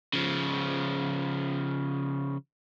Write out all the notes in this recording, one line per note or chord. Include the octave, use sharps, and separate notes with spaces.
C#3 F3